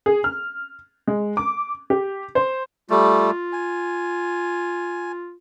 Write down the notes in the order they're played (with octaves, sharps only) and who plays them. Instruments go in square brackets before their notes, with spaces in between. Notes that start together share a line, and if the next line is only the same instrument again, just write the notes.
[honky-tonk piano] G#4
F6
G#3
D6
G4
C5
[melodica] G3 A3 [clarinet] F4
[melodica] G#5